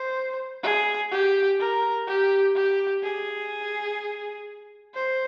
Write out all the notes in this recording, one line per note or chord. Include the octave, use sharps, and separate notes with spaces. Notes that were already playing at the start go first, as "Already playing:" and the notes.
Already playing: C5
G#4
G4
A#4
G4
G4
G#4
C5